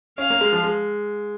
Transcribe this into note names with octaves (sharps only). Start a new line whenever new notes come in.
C#4 F5
A#3
G#3
F3
G#3